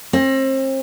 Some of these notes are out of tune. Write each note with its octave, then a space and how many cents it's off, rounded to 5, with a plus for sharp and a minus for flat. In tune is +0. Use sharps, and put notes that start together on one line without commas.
C4 +35